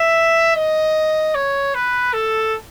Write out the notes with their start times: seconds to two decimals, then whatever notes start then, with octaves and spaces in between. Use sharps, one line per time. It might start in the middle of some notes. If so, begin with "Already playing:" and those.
Already playing: E5
0.56 D#5
1.34 C#5
1.74 B4
2.13 A4